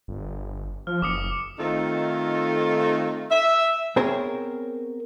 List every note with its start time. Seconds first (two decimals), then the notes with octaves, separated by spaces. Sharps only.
0.08 G1
0.87 F3 F6
1.02 F#1 D6 D#6 C#7
1.59 D#3 A3 C4 D#4 F4 A4
3.31 E5
3.96 B3 C4 G#4 A#4 C5 C#5